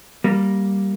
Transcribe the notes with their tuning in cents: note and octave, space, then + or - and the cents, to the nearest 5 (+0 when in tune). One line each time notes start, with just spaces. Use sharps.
G3 -5 A#3 +0